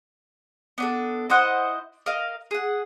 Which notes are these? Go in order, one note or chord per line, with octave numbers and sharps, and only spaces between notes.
B3 D4 A4
E4 C5 D#5 F#5
A#4 D#5 F5
G#4 F#5